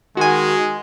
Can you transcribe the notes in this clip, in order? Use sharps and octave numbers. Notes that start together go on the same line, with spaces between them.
D#3 G#3 F#4 G#5